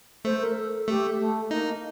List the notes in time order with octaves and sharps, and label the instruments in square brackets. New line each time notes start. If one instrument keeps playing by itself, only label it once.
[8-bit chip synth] A3 [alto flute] C5
[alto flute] A#4
A4
[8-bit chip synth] A3 [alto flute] G4
[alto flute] A3
[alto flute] A#3 [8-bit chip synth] D#4